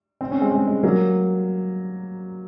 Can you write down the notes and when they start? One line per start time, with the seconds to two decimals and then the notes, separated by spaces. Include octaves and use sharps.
0.21 C4
0.31 C#4
0.41 G#3 C4
0.52 G#3
0.67 G#3
0.83 F#3 A#3